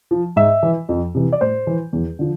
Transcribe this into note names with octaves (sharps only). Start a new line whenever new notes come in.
F3
G#2 E5
E3
F2
C3 E3
D5
A2 C5
E3
E2
D3 F3